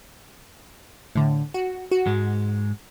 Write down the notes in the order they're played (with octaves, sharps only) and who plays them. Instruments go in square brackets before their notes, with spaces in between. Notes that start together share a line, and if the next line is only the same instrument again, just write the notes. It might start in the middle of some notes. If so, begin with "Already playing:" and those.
[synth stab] A2 D3
F#4
F#4
[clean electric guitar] G#2 G#3